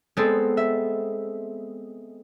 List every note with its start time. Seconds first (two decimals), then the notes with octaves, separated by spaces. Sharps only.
0.17 G#3 B3 C4 A4
0.57 E5